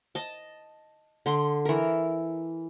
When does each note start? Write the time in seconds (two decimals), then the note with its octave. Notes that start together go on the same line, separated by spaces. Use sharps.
0.15 D#5 A5
1.26 D3 C6
1.65 E3 A#4